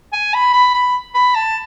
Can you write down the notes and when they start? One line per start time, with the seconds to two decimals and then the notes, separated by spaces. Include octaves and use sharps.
0.13 G#5
0.34 B5
0.53 B5
0.74 B5
1.15 B5
1.35 A5